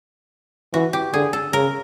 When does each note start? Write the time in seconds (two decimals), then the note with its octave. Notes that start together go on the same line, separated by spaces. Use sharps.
0.73 E3 F#4
0.93 G4
1.13 D3 G#4
1.33 A4
1.53 C#3 A#4